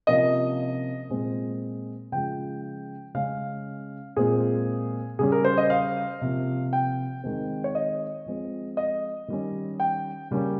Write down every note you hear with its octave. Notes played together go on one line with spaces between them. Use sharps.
C3 F3 A#3 C#4 D#5
A#2 G#3 C4
C#3 F3 G#3 G5
C#3 G#3 C#4 F5
A#2 G#3 C4 G#4
C#3 G3 C#4 G#4
A#4
C5
D#5
F5
C3 F3 A#3
G5
D#3 G#3 C4
C#5
D#5
F3 G#3 C4
D#5
D#3 G3 C#4
G5
C#3 G3 A#3 C#4